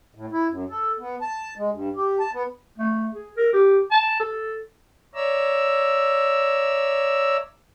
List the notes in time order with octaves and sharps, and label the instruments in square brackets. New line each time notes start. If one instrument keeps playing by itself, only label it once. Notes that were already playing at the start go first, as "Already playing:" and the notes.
[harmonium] A2
E4
F#2
A4
B3
A5
G#3
G2
G4
A5
B3
[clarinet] A3
G#4
A#4
G4
A5
A4
[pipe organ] C#5 D5 E5 A#5 E6